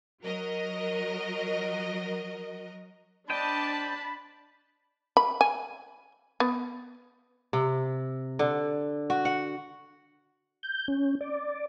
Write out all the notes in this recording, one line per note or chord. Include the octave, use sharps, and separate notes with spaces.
F#3 F#4 A#4 D#5
D4 C5 D#5 G5 A5 B5
B5
G#5
B3
C3
D3
F#4
F#5
G6
C#4
D5